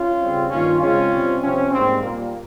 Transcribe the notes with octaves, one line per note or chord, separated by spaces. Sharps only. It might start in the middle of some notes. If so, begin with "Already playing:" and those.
Already playing: C#4 F4
C#3 G3 C4
G2 D#3 A#3 C#4 F4
C#3 G#3 C4 C#4 F4
C3 G3 C4
C3 F3 C4 C#4
G#2 G3 A#3 C4
A#2 G3 A#3